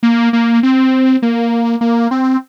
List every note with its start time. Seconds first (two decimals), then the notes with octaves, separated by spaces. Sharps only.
0.03 A#3
0.33 A#3
0.63 C4
1.22 A#3
1.81 A#3
2.11 C4